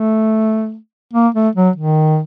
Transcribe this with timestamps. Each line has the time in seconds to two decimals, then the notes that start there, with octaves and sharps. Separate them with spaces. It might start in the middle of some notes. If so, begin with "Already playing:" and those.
Already playing: A3
1.14 A#3
1.35 A3
1.55 F#3
1.76 D#3